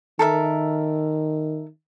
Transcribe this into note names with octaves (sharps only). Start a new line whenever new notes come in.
D#3 A4 A#4 E5